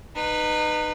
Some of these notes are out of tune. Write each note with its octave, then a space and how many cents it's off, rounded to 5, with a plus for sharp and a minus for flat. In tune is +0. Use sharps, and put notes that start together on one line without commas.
D#4 -30 B4 +0